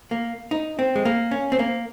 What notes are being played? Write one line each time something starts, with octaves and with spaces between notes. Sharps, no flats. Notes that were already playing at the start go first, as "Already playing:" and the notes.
A#3
D#4
C4
G#3
A#3
C#4
C4
A#3